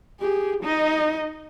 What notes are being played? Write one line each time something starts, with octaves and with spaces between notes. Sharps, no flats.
G4 G#4
D#4 D#5